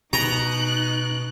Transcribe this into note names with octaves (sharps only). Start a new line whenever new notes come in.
B2 D#4 A#5 F#6